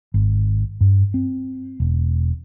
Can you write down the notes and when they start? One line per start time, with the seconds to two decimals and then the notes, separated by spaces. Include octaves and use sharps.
0.14 G#1
0.81 G2
1.14 C4
1.80 E1